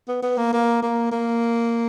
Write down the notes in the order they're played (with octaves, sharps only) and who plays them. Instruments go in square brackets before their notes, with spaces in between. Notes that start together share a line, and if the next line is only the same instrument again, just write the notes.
[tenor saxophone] B3
B3
A#3
A#3
A#3
A#3